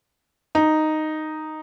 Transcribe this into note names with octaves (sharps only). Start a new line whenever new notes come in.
D#4